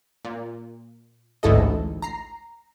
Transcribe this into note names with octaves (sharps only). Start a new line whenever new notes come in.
A#2
A1 D2 G#2 E4 A4 D#5
A#5 C7